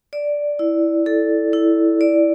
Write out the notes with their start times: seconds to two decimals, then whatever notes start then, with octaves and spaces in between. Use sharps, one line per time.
0.13 D5
0.59 E4
1.06 A4
1.53 E4
2.01 D5